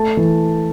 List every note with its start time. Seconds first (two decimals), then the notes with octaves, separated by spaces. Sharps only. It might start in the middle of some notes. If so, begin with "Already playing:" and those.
Already playing: A3 A5
0.17 E3